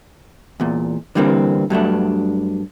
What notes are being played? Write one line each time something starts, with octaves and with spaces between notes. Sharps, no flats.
E2 A#2
D3 E3 G3 A#3 C4
G2 F#3 A3 D4